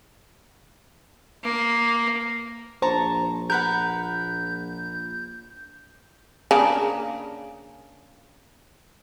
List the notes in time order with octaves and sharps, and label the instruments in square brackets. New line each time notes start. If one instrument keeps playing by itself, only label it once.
[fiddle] A#3
[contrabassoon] A#1 [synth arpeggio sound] C5 [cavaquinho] A5 A#5 C#6
[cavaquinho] A#4 B4 F#5 [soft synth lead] G6
[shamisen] C#3 A#3 D4